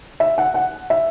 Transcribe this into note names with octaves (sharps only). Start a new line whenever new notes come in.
E5
F#5
F#5
E5